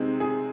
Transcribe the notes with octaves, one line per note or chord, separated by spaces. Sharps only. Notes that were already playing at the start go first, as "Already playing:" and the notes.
Already playing: C3 G#3 C4 D#4
G#4